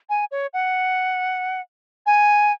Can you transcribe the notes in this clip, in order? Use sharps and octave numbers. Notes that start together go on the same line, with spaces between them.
G#5
C#5
F#5
G#5